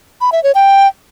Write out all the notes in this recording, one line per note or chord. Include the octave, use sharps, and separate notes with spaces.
B5
E5
C#5
G5